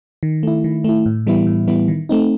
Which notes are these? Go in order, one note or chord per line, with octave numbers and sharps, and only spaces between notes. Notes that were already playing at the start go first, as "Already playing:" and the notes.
D#3
A3 E4
D#3
A3 E4
A2
E3 G3 B3 E4
A2
E3 G3 B3 E4
D#3
A3 C4 D#4